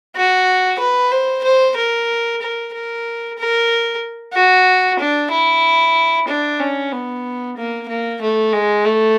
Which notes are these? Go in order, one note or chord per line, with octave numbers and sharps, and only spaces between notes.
F#4
B4
C5
C5
A#4
A#4
A#4
A#4
F#4
D4
E4
D4
C#4
B3
A#3
A#3
A3
G#3
A3